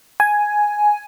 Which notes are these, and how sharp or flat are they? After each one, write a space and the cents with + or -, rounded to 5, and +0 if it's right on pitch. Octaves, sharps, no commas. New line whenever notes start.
G#5 +5